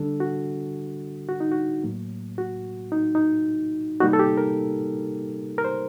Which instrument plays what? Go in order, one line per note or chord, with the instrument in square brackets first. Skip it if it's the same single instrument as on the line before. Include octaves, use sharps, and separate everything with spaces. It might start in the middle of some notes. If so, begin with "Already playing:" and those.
Already playing: [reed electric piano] D3 G3 D4 A4
F#4
F#4
D#4
F#4
A2 F#3 A#3
F#4
D#4
D#4
C3 G3 A#3 D#4 F#4
A4
G4
A#4
A#4
C5